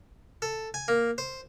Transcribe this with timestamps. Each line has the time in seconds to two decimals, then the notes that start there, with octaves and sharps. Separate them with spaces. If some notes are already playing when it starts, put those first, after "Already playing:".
0.42 A4
0.74 G#5
0.88 A#3
1.18 C5